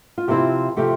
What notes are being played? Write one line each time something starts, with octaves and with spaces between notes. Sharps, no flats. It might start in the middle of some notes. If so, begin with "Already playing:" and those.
F4
C3 F3 C4 E4 G4
C3 F3 A3 G4